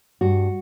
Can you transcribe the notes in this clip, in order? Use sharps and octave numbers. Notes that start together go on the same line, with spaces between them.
G2 F#4